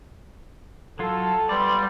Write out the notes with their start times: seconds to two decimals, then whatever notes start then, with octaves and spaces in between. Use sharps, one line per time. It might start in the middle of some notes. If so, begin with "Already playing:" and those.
0.99 F#3 F4 A4
1.49 G3 B3 D5 C6